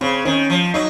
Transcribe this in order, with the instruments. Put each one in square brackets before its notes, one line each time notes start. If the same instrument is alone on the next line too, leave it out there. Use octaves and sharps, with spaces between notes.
[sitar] C#3 [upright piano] C4
[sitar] D#3 [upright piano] C#4
[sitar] F3
[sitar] F#3 [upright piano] D#4